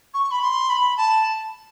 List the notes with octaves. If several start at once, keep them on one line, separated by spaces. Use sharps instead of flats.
C#6
B5
C6
B5
A5